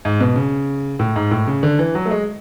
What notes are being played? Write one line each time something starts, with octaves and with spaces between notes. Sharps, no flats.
G#2
B2
C#3
A2
G#2
A2
C#3
D3
E3
F#3
A3
G#3